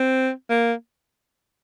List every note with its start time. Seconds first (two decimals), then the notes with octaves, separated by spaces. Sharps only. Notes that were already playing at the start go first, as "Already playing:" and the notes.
Already playing: C4
0.50 A#3